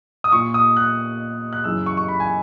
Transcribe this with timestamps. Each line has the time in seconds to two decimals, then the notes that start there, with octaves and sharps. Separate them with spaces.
0.24 D#6
0.32 A#2 C#6
0.54 D#6
0.77 F#6
1.53 F#6
1.64 F#2 C#3 E3 E6
1.86 C#6
1.97 C#6
2.08 B5
2.20 G#5